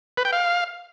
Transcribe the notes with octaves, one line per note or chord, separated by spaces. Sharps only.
B4
G5
F5